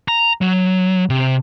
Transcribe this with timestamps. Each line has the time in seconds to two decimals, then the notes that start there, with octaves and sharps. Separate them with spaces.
0.08 A#5
0.41 F#3
1.10 C3